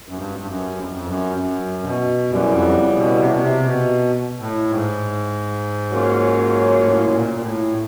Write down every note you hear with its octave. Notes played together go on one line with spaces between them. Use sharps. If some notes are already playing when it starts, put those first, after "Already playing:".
F#2
G2
G2
F#2
F2
F2
F#2
F#2
B2
F#2 C#3 E3 G3 B3
F2
B2
C3
B2
C3
B2
A2
G#2
C#3 F#3 A#3 C#4 F4
A2
B2
A#2
A#2
A2